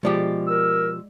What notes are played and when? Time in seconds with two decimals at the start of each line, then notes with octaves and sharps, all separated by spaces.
0.03 B2 F3 G#3 G4 D5
0.48 A#4 E6